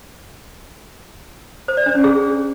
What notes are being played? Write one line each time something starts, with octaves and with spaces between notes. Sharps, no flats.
C5
D5
D4
C#4
G#4